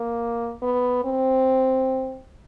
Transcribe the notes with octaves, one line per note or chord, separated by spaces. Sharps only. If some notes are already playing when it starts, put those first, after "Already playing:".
Already playing: A#3
B3
C4